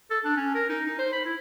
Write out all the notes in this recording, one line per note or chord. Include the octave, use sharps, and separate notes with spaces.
A4
D4
C#4
A#4
D#4
D#4
C5
B5
E4